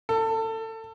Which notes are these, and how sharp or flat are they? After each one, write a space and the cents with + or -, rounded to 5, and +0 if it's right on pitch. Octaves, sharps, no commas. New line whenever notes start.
A4 +25